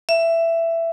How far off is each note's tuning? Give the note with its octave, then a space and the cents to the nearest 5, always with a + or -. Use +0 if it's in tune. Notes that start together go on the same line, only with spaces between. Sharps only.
E5 +15